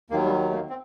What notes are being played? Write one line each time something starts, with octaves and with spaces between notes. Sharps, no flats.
D#2 D#3 F#3 A#3
G3
A3
A#3
C4